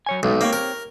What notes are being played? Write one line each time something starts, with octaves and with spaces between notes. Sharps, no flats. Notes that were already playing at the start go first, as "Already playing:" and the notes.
F#3 C#5 G#5
B1 C3 G#3 A3
A#3 C4 G4 C#5
A#4